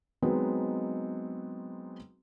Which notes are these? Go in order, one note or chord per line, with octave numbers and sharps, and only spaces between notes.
F#3 G#3 B3 C4 D#4